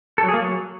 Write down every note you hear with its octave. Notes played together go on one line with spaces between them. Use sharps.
A4
F#3
G#4
A#3
F#3